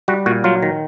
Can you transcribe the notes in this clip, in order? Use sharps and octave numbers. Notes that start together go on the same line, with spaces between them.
G3 F#4
A#2 F#4
F#3 F4
D#3